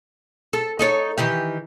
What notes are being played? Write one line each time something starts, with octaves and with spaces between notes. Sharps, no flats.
A4
D#4 A4 C#5
D#3 E3 G4